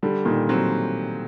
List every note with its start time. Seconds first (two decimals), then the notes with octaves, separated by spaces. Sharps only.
0.03 D3 G3
0.25 A#2 D#3
0.49 F#3 C4